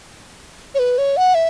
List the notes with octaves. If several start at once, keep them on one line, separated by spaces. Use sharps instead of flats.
C#5
B4
C#5
F#5
E5